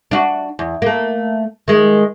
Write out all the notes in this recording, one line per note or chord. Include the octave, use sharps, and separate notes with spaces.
D4 F4 F#4
E2
A3 A#3
D#3 G#3